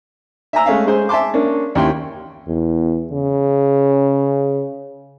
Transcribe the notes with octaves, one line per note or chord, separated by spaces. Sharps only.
E5 G#5 A#5 E6
G#3 A3 C#4 E5 F5
G#3 C#4 G#4 C5
E5 G#5 A5 C6 D6
A#3 C#4 D4
D#2 C#4 E4 G5 C6
E2
C#3